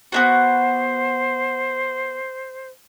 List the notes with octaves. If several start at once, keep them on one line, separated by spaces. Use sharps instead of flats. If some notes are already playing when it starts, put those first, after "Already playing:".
B3 D4 F#4 C5